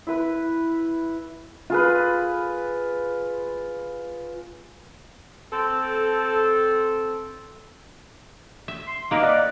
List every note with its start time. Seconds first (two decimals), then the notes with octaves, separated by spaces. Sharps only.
0.07 E4 B4
1.70 F4 G#4 B4
5.52 C4 A4
8.68 E5
8.87 C6
9.11 A#3 D#4 A#4 B4 D6
9.23 D5 D#5 F#5